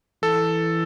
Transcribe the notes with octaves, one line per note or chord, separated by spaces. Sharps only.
E3 A4